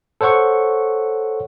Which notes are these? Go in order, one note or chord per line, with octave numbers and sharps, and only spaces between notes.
A4 C5 C#5 F#5 C#6